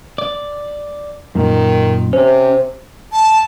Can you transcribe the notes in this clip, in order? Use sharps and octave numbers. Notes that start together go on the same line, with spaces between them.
D5
F#2 A#2 D#3
C3 C#4 C5
A5